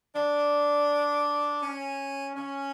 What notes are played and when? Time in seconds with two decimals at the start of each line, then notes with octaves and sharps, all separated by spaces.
0.14 D4
1.62 C#4
2.35 C#4